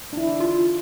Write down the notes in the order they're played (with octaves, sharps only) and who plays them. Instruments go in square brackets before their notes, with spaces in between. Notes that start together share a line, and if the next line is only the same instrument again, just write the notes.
[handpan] D4 E4
[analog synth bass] F4